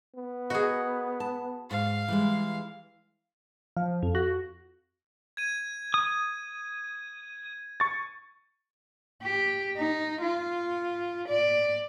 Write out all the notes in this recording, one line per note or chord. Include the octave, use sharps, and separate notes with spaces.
B3
F#4 G#4 A#4 D#5
A5
G#2 F5
E3 G3 G#3
F3
F2
F#4
G#6 D#7
D#6
C#6 A6
G4
D#4
F4
D5